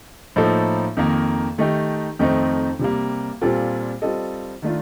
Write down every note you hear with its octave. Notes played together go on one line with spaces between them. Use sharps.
A2 F3 A#3 D#4 A4
F2 D#3 A#3
D#3 A3 D#4 G4
F2 D#3 A3 C4 D#4
C3 G3 A#3
A#2 G3 C4 F4 A4
G3 C4 F4 A4 D#5
D#3 A3 D4 F4